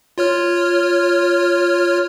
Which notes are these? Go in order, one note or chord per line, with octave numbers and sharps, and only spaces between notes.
F4 C#5 F6